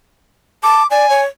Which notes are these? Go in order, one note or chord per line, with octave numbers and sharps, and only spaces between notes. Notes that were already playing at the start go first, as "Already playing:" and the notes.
A5 D6
D5 G#5
C#5